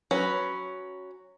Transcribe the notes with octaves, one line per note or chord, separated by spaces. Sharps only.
F#3 C#4 B4